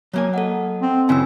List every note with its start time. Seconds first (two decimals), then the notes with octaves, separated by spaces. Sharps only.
0.13 F#3 A#3 G#5
0.34 A4 D#5 F#5
0.82 C4
1.09 F#2 C#3 E3 C4 G#5 E6